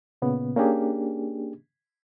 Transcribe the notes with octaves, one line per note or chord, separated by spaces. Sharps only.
A#2 C#3 B3
A#3 C#4 D4 G4 G#4